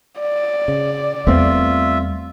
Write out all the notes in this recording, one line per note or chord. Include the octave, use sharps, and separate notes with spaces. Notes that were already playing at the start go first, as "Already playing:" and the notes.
D5
C#3
E2 G3 A3 B3 C4 F4 E5